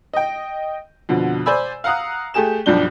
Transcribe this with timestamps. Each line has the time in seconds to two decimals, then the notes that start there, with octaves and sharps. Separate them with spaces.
0.13 D#5 G5
1.09 F2 B2 D3
1.46 C5 D5 G#5 B5 E6
1.84 F5 F#5 A#5 D#6 F#6
2.34 A3 G4 G#4 E7
2.66 B1 G2 F3 G3 D4 G7